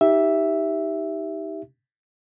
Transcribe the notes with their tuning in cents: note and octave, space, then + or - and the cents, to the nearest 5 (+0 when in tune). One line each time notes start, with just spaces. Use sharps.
D#4 +25 G4 +0 E5 +0